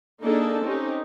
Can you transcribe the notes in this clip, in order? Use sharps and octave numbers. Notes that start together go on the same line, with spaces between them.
A#3 D4 D#4 G#4 A4
C4 C#4 D#4 G4